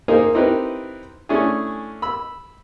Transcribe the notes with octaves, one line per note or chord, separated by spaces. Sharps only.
A#3 D#4 G#4 A#4 C5
C4 D#4 E4 G4 A#4 B4
A3 C#4 D4 E4 G#4
B5 E6